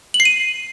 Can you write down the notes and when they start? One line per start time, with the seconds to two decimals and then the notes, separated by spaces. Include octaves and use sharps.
0.14 F#7
0.20 C7
0.25 D#7